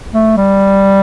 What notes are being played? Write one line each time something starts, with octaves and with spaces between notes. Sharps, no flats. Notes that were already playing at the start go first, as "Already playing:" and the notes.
A3
G3